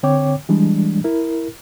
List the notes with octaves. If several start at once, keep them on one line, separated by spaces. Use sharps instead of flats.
D3 C4 C#5 G5 D6
E3 G3 G#3 D4
E4 A#4